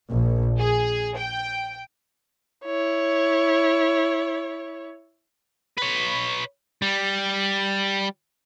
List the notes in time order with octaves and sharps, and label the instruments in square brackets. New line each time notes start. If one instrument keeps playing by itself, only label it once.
[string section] A#1
G#4
G5
[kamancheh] E4 C#5
[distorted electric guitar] B4 C#5
G3